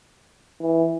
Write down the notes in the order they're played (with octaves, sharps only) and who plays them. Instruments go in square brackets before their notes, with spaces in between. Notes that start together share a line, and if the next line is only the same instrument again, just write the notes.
[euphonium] E3